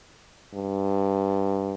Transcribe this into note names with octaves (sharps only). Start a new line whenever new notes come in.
G2